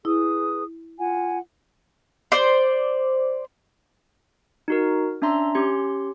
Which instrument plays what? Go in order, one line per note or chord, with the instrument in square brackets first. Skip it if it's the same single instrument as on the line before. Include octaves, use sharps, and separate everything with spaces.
[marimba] E4 [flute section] G#4 B4 D#6
[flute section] F4 F#5 G#5
[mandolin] C5 D5
[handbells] D#4 F#4 A#4
C#4 D4 E5 A#5 C6
C#4 G4 C6